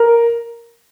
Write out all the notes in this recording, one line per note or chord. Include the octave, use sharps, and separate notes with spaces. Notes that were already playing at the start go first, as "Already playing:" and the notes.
Already playing: A#4